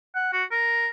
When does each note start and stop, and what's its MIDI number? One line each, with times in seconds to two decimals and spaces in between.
0.15 0.30 78
0.33 0.44 66
0.51 0.89 70